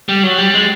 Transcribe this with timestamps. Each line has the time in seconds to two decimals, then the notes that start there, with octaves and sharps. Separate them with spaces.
0.09 G3
0.23 F#3
0.38 G3
0.54 G#3